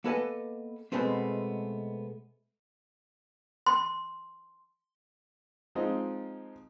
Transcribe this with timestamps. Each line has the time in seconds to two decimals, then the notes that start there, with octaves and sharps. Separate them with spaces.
0.04 A#3 B3 A4 B4 D#5 G#5
0.92 B2 G#3 A3 B3 C4
3.67 C6
5.75 F3 G#3 C4 D#4 F4 D#5